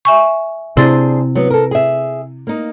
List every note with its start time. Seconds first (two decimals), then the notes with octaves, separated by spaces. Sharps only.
0.05 E5 G#5 C#6
0.77 C3 D4 E4 G#4 C5 A6
1.35 F#3 B3
1.50 A4 A#4
1.71 G#4 E5
2.47 A#3 D#4